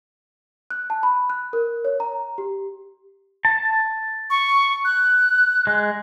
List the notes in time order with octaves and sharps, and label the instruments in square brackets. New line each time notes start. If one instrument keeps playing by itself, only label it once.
[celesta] F#6
A5
B5
F#6
A#4
C#5
A#5
G4
[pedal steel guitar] A5
[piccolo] C#6
F#6
[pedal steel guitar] G#3